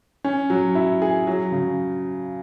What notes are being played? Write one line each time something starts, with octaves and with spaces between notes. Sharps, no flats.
C#4
F#3
E4
G#4
F#3
C#3